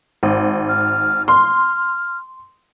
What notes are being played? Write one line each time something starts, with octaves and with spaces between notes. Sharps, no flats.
G#1
F6
C6 F6